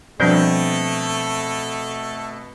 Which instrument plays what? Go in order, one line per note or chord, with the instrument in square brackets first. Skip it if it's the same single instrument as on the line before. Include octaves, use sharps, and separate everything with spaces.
[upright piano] B2 G6 [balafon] F3 G3 D4 [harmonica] A3 A4 [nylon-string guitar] C4